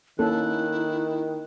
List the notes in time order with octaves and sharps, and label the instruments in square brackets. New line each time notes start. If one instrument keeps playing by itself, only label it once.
[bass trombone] D#3 [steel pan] A#3 C#4 A4 [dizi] E4 [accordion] F#6